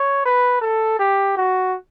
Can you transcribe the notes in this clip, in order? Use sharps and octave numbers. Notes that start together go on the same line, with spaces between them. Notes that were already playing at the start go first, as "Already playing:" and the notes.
Already playing: C#5
B4
A4
G4
F#4